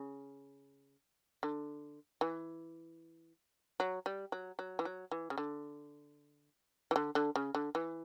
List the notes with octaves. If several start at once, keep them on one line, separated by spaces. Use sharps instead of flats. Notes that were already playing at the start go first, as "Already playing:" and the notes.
Already playing: C#3
D3
E3
F#3
G3
F#3
F#3
E3
F#3
E3
C#3
D3
E3
D3
D3
C#3
D3
E3